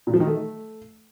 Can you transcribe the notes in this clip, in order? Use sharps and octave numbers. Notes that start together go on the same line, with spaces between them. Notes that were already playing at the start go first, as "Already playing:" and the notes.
A#2
F3
D#3
A3